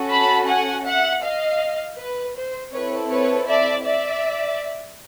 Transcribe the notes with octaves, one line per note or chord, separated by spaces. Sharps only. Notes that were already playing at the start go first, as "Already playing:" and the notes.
Already playing: C#4 F#4 A4
A5 B5
F#5 G#5
E5 F#5
D#5 F5
B4
C5
C4 E4 A4 B4 C#5
B4 C#5
D5 E5
D5 E5